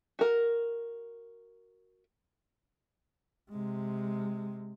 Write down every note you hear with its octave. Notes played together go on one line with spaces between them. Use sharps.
F#4 A#4
C3 G#3